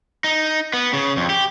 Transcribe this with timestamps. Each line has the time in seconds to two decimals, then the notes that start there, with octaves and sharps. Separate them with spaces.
0.24 D#4
0.73 B3
0.93 C#3
1.17 F2
1.30 G4